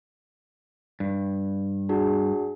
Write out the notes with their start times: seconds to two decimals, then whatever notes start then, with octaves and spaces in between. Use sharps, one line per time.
1.00 G2
1.89 D4 F#4 G#4